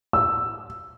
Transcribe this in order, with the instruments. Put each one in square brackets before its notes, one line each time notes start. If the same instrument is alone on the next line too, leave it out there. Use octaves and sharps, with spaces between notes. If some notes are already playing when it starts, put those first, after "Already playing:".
[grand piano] E6